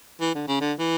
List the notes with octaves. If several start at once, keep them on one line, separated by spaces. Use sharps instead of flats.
E3
D3
C#3
D3
E3